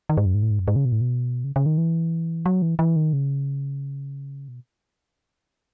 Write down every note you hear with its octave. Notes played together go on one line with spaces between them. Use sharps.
D#3
G#2
F#2
G#2
A2
G#2
F#2
G#2
C#3
B2
A2
B2
C#3
C#3
D#3
E3
F#3
E3
E3
D#3
C#3
B2